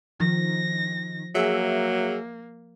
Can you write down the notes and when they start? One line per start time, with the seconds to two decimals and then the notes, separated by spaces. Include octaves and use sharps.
0.20 D#3 F3 A#6
1.35 F#3 A#3 G#4 E5